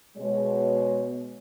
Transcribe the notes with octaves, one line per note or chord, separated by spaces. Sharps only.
B2 G#3 C#5